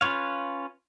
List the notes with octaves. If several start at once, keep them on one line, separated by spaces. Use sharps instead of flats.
C#4 F4 B4 C#5 F5